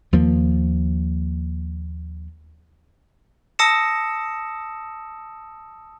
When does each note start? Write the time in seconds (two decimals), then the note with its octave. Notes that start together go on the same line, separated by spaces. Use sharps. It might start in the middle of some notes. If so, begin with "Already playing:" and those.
0.12 D#2 F3 A#3
3.59 A5 D#6 E6 A#6 C#7 E7